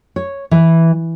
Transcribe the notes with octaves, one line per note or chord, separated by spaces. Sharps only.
C#5
E3